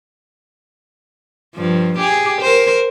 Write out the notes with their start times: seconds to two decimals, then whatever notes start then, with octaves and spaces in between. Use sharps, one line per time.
1.55 G2 F3
1.98 G4 G#4
2.41 A#4 C5